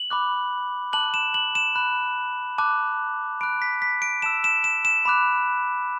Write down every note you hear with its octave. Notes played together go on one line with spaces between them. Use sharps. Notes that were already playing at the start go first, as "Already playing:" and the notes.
Already playing: F#7
B5 D6 F#6
A5 D6 F#6 F#7
E7
F#7
E7
B5 F#6
A5 D6 F#6
B5 F#6 D7
B6
B6
D7
A5 E6 E7
E7
E7
E7
B5 D6 F#6